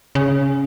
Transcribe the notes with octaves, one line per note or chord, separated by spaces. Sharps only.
C#3